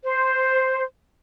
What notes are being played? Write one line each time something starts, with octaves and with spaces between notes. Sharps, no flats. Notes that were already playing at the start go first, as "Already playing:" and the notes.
C5